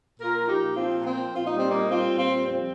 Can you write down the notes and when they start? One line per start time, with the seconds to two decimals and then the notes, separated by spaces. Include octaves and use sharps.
0.20 A#2 F4 A#4
0.39 F3
0.48 D#4 G4
0.58 A#2
0.76 F3 C4 F4
0.95 A#2
1.05 C4
1.14 F3
1.34 A#2 F4
1.46 D#4
1.53 G3
1.59 C4
1.70 A#2 A#3 D#4
1.90 G3 C4 F4
2.09 A#2
2.18 C4 F4
2.29 G3
2.47 F2 C4